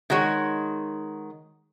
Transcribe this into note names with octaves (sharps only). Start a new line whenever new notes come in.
D#3 G#3 F#4 C#5